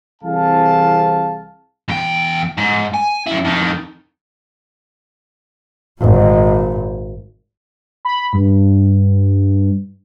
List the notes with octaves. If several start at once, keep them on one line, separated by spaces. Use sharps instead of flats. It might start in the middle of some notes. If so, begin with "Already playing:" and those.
C2 E3 C4 G#4 F5 A5
E2 G5
G#2
G#5
F#2 E4
F2 D#3
G#1 A#2
B5
G2